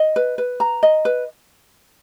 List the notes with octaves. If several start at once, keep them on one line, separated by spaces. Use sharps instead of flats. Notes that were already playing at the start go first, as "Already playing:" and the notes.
Already playing: D#5
B4
B4
A#5
D#5
B4